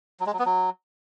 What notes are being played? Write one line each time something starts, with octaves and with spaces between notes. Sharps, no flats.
F#3
G#3
F#3
B3
F#3